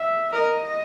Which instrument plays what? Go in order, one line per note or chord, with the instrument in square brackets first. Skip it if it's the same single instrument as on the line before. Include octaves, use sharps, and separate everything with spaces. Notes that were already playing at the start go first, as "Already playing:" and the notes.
Already playing: [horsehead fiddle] E5
[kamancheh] A#4 [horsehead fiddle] D#5